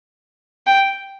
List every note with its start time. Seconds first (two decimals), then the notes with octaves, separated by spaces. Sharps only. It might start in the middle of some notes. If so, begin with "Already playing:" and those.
0.67 G5